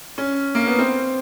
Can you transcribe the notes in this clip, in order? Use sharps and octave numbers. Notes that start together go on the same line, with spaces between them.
C#4
A#3
B3
C4